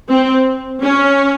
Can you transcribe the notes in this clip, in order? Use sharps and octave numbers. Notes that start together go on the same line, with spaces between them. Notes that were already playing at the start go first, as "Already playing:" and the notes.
C4
C#4